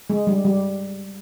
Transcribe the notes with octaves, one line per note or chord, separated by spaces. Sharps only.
G#3
G3
G3